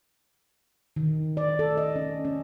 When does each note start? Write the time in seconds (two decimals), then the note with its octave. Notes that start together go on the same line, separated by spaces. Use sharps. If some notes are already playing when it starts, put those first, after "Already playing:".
0.96 D#3
1.37 D5
1.59 A4
1.77 D#5
1.96 C#4
2.25 C#4